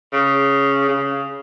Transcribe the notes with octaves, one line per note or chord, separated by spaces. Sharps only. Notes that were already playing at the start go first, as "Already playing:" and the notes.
C#3
C#3